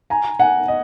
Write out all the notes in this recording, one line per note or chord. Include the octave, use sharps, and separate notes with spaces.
G#5 A#5
F#5 G#5
D#5